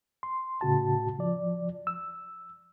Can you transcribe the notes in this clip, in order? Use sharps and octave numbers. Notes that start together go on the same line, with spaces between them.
C6
A2 C#3 F#4 A5
F3 D5
E6